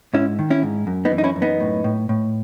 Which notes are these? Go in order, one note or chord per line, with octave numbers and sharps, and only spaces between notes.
G#2 C#4 E4
D#3
C#4 E4
G#2
F#2
B3 D#4
E3
D#4
C#4 E4
F#2
B3 D#4
A2
A2
A2